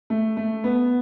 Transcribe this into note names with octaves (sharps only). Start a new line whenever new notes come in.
A3
A3
B3